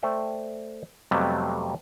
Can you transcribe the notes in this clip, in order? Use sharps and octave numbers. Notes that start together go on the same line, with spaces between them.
A3 C5 D5 E5 G5
F2 C3 F#3 G3 A3 B3